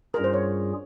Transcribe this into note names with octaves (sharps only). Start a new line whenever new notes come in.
G2 G3 C#4 F4 G#4 A#4
C5
C#5